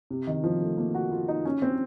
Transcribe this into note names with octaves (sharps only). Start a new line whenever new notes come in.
C3
D#3
F3
A3
A#3
F#4
F4
D#4
C#4
C4